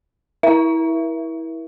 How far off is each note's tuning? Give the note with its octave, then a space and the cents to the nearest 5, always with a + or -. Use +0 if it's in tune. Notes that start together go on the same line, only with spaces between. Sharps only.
E4 -15 A#4 +40 E5 +20